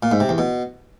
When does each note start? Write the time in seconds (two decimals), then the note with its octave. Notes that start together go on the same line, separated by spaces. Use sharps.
0.03 A#2
0.11 G#2
0.20 C3
0.29 E2
0.38 B2